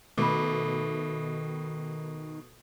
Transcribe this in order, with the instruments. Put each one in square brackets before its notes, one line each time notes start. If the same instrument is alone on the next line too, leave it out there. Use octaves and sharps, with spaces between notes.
[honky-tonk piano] B2 [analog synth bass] D#3 [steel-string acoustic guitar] A3 [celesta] B5 D6